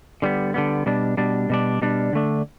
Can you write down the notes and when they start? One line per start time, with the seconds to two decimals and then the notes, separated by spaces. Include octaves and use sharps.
0.22 D3 G3 B3
0.54 D3 G3 B3
0.86 B2 G3 D4
1.17 B2 G3 D4
1.50 B2 G3 D4
1.82 B2 G3 D4
2.13 D3 A3 D4